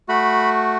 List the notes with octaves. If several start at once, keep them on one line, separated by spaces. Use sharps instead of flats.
A3 F#4 B5